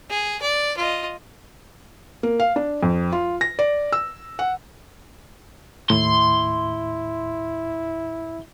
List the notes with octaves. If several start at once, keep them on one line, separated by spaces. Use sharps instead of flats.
G#4
D5
F4 D#5
A#3
F5
D4
F2
F4
A#6
D5
E6
F#5
D#2 A2 E4 C6